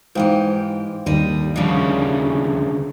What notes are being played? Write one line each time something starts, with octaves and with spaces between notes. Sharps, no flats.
G#2 E3 G4 C5 F5 G5
D#2 D3 D#3 G3 D#5
D2 C#3 F3 G3